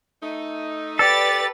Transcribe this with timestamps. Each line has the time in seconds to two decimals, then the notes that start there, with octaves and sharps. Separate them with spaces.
0.22 A3 D#4
0.99 G4 A4 B4 D5 A6